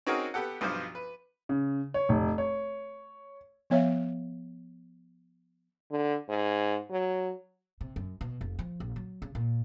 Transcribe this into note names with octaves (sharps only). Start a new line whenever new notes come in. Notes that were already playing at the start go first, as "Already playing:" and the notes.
C4 C#4 D#4 F#4 G#4 A#4
B3 G4 A4 F#5
B1 G2 F3 B3 C5 D6
B4
C#3
C#5
F1
C#5
F3 B3 C#5 E5 F5
D3
G#2
F#3
C3
F#2
B2
F1
F3
A#1
F#3
C#3
A#2